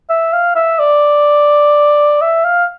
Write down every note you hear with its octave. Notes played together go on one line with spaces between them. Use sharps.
E5
F5
E5
D5
E5
F5